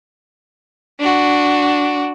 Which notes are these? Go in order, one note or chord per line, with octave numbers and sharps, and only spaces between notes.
D4 F#4